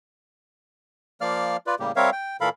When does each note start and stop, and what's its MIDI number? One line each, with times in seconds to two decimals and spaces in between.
1.21 1.57 53
1.21 1.57 58
1.21 1.57 74
1.21 1.57 77
1.21 1.57 89
1.67 1.75 65
1.67 1.75 71
1.67 1.75 74
1.80 1.92 45
1.80 1.92 49
1.80 1.92 55
1.80 1.92 58
1.80 1.92 67
1.96 2.10 55
1.96 2.10 60
1.96 2.10 70
1.96 2.10 73
1.96 2.10 76
1.96 2.10 77
2.12 2.37 79
2.41 2.49 46
2.41 2.49 52
2.41 2.49 69
2.41 2.49 70
2.41 2.49 77
2.41 2.49 83